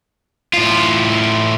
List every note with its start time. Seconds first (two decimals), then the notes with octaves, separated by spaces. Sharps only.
0.54 A2 F4